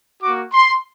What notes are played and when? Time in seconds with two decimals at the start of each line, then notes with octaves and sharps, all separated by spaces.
0.23 A#3 F#4 D6
0.54 C6